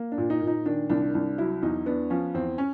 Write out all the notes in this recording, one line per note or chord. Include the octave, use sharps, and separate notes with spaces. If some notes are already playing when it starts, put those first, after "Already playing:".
Already playing: A#3
D4
A#2
D#4
A#2
D#4
D#3 D4
C2 D4
C2 D4
F#3 E4
E2 D#4
B3 D4
F3 C#4
E2 C4
C#4